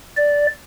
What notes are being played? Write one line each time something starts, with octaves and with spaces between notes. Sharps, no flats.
D5